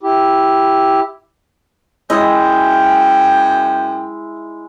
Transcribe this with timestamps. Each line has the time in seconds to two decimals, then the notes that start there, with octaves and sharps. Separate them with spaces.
0.03 E4 G4
2.10 F#2 G#3 E4 D#5 E5 G5